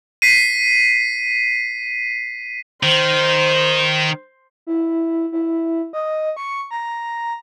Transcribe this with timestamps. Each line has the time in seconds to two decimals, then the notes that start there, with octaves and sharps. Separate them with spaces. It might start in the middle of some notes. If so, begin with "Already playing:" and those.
0.22 B6 C7 D#7
2.83 D#3 C5
4.67 E4
5.32 E4
5.93 D#5
6.37 C#6
6.71 A#5